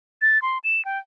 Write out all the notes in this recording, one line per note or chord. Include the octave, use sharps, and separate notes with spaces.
A6
C6
E7
G5